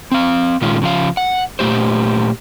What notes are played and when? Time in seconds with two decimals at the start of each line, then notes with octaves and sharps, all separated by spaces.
0.12 C4 F5
0.61 A#2 D#3 G#3 C#4 F4
0.82 C#3 F3 F5
1.17 F#5
1.59 A#2 A3 G4 C5